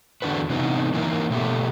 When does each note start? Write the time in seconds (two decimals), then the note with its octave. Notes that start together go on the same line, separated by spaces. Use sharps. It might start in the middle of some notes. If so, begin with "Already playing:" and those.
0.22 E2 D3 A3 D4 F#4 B4
0.50 C3 E3 B3 D#4
0.94 E3 A#3 D#4 A#4
1.31 B2 A3 B3 G4